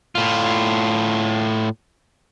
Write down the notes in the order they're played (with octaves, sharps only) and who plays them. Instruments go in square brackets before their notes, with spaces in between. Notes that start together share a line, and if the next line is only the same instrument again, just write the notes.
[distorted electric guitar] A2 F4